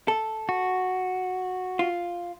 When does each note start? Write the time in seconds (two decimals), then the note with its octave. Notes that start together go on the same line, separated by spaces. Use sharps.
0.08 A4
0.49 F#4
1.79 F4